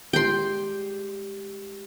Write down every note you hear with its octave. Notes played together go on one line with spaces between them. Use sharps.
G#3 G4 G5 C6